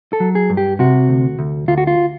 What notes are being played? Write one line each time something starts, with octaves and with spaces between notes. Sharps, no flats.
A4
F#3
G#4
G2
G4
C3 F#4
D2
D2
D2 F4
F#4
F4